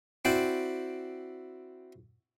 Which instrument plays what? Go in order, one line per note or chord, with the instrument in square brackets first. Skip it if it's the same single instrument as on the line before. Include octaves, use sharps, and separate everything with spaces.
[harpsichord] C4 E4 F#4 D5 G5